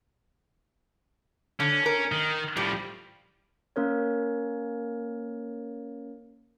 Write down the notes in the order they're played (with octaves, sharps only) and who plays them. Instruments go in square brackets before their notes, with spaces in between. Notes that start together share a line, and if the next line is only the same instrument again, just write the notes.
[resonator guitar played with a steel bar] D3 [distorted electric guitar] C#4
[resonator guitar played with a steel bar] A#4
[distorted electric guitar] D#3
[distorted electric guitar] A2 F3 [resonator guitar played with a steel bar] G3
[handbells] A#3 C#4 A#4 C#5